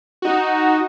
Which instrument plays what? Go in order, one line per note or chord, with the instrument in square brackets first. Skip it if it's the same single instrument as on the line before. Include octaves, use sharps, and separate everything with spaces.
[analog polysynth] D#4 F#4